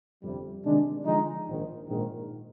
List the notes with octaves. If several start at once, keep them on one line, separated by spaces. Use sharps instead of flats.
G1 F2 C3 G3
C3 D#3 G#3 D4
D3 F3 G#3 D#4
A#1 G#2 D#3
A#1 G#2 D#3